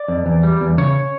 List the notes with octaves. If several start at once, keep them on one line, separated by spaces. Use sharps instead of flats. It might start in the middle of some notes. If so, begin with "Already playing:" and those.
Already playing: D5
F2
E2
G3
E2
C#3 C#5